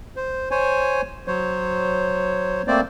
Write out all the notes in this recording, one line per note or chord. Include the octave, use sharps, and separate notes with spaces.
C5
C5 C#5 G#5
F#3 C5 C#5
A3 A#3 C4 C5 D5